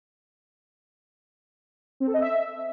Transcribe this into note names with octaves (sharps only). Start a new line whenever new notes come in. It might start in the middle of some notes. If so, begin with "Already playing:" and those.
C4
A4
D#5
E5